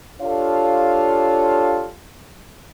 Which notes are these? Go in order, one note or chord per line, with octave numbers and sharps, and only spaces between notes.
D4 F4 G4 A4 C#5 F5